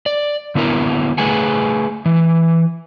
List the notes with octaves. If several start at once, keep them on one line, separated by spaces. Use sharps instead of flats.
D5
D3 B3 E4 A#4
A3 G#4 B4 F#5 G#5
E3